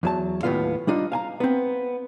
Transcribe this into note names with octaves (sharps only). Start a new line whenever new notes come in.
E2 F#3 A5
D#2 A2 F3 B3 F4 F5
G3 D4 D#4 F4
F5 G#5 A#5
B3 C4